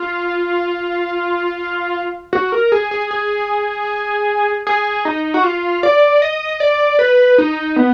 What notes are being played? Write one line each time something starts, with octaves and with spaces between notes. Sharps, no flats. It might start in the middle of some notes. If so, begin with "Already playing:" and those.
Already playing: F4
F#4
A#4
G#4
G#4
G#4
G#4
D#4
F#4
F4
D5
D#5
D5
B4
D#4
B3